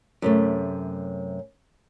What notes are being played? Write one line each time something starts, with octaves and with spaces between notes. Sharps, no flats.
F#2 C3 A3